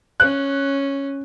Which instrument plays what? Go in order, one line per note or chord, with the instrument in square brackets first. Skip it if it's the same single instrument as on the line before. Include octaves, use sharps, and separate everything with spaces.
[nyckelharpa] C#4 [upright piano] F#6